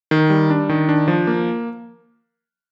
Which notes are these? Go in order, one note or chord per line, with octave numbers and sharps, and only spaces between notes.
D#3
G3
D4
D#3
D4
F3
A#3